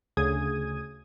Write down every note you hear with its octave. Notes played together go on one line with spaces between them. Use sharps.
D2 C#3 G#4 D#6 G#6 D#7